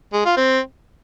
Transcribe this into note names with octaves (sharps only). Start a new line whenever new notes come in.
G#3
F4
C4